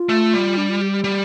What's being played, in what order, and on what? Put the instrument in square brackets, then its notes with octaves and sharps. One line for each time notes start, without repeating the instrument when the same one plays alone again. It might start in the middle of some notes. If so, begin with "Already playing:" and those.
Already playing: [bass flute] F4
[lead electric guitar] A3
G3
[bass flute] D4
F4
G4
G4
[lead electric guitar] G3